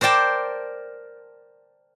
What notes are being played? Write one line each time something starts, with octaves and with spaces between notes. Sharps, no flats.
A#4 C5 D5 G5 A5